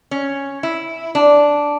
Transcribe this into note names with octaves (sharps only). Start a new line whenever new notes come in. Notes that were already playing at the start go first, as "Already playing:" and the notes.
C#4
E4
D4